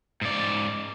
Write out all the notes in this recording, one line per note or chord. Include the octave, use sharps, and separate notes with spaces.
G#2 D5